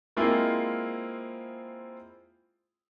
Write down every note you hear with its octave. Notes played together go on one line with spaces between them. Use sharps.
G#3 A#3 C4 E4 F4 G#4